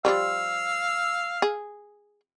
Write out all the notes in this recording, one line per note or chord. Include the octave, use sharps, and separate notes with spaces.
F3 G3 G#3 F5 E6
G#4